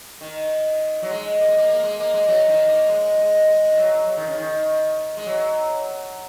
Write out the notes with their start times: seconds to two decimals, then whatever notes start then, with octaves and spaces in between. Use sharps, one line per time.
0.21 D#3
1.02 F#3
1.10 G#3
1.40 A#3
1.48 G#3
1.57 A#3
1.69 A#3
1.84 G#3
2.00 A#3
2.14 G#3
2.28 F#3
2.48 D#3
2.68 A#3
2.89 G#3
3.18 G#3
3.47 G#3
3.71 D#3
3.78 F#3
4.07 F#3
4.17 D#3
4.27 C#3
4.38 D#3
5.17 G#3
5.26 F#3